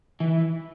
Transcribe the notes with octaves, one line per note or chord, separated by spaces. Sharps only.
E3